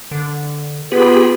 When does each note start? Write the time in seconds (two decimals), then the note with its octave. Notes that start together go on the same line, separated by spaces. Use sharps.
0.11 D3
0.92 B3 F4 G4 G#4 B4 B5